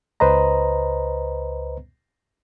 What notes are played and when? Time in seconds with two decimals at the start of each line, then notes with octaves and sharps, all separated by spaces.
0.20 C#2 B4 C5 D#5 A#5